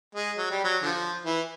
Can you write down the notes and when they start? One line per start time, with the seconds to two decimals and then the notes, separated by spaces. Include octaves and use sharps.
0.15 G#3
0.37 F#3
0.50 G3
0.64 F#3
0.82 D3 F3
1.25 E3